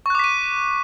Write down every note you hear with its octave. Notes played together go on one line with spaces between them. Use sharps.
C#6 D6 F#6 B6 D#7